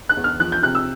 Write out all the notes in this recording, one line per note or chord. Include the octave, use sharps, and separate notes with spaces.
F#6
E2
F6
F3 F#6
G6
C3 F#6
E6